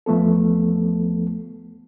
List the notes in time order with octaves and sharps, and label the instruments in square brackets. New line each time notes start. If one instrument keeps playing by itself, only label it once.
[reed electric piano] E2 F3 A3 B3 A4